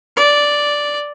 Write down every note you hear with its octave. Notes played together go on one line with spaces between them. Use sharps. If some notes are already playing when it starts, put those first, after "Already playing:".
D5